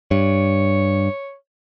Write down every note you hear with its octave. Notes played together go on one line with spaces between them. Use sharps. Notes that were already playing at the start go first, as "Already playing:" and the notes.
G2 C#5